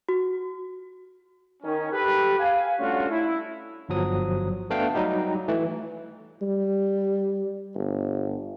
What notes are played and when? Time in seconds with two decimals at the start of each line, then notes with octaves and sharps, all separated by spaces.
0.09 F#4
1.63 D#3 C#4
1.93 G4 A4 B4
2.40 F5 G#5
2.79 G3 A3 C#4 D4 F4 F#4
3.10 E4
3.89 G1 F3 F#3 D#6
4.70 A3 B3 D4 F5 G5
4.94 F#3 G3 D#4 G4
5.48 E3 A3
6.42 G3
7.75 G1